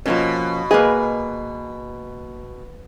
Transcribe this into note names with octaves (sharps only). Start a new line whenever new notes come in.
B2 F3 A#3 C#4
A#3 G#4 B4 D#5